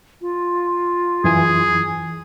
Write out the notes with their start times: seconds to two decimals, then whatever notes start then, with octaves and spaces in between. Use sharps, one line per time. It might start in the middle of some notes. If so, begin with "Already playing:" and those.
0.21 F4
1.24 F#2 E3 G#4 G#5